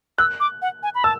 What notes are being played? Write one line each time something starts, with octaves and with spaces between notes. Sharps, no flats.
E6 F#6
D6
F#5
G#5
B5
A5 E6